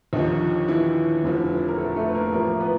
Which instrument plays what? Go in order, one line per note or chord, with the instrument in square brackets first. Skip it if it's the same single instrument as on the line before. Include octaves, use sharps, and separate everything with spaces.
[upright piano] D#2 D3 D#3 F3 D#4
E3 E4
F1 F2 D3 F3
A#4
A3 A4
A3 A4
B4
A#3 A#4
A1 A2 F3 A#3 A#4
B3 B4